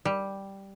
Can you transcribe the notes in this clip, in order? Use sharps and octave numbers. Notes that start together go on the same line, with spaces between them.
G3